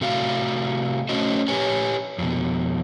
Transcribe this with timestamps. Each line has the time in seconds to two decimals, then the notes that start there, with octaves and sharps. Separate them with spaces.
0.01 C3 A3 F#4 F5
1.09 A3 C#4 F#4 C5 D#5
1.48 G4 B4 C#5 G#5
2.18 F2 B2